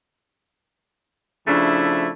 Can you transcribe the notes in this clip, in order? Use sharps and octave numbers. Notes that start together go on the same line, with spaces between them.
C#3 F3 A3 D4 E4